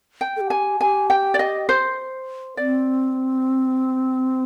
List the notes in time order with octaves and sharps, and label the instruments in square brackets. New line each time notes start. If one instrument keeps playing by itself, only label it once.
[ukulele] G5
[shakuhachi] A4
G4
[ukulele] G#5
[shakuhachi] G4 [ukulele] G#5
[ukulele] G5
D5
D#5
C5
[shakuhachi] C4 [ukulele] D5